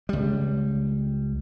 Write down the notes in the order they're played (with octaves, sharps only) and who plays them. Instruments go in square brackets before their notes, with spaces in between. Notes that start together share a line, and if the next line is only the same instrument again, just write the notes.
[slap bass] C#2 G3